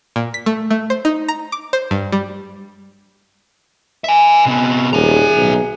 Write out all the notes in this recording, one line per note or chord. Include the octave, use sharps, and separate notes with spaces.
A#2
B6
A3
A3
C5
D#4
A#5
D6
C5
G2
G3
E5 G#5
C3 B3
D#1 G#4 E5 A#5
B1